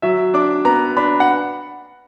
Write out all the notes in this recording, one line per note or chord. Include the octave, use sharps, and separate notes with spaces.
F#3 E5
D4 D6
B3 A#5
D4 B5
F#5